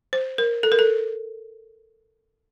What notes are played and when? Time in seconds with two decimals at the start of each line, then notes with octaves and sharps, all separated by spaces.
0.13 C5
0.38 A#4
0.63 A4
0.72 A#4
0.79 A4